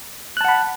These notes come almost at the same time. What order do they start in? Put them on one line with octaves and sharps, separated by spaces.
F#6 A5 F#5 B5